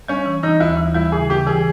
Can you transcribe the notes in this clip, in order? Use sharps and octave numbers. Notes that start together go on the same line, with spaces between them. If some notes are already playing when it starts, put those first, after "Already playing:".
G3 C#4
E3
E3 D#4
D#2 E4
E3
G3 E4
C#3 G#4
C#3 G4
E3 G#4